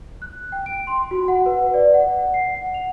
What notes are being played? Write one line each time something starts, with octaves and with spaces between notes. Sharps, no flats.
F#6
G5
D7
C6
F#4
F#5
B4
D5
F#5
C7
F#5
F7